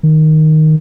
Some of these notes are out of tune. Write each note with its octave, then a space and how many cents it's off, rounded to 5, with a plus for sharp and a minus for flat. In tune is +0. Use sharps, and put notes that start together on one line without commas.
D#3 +0